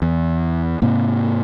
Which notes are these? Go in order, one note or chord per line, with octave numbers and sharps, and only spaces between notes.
E2
G#2 C3 A#3